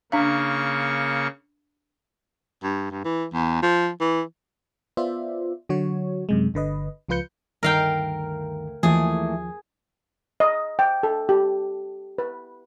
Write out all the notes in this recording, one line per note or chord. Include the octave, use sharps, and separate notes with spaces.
C#3 A#3 D4 F5 C#6
G2
G2
E3
E2
F3
E3
B3 F4 C5 D5 E5
D3 F#3 F#4 C#5
F#2 C3 G#3
G1 D3 B4 D#5
C#2 F3 F4 B4 G6 C#7
D2 G2 D#3 A#4 F5 G5
D#2 E3 F3 A3 A#3 G#4
D#5
G5
A4
G4
B4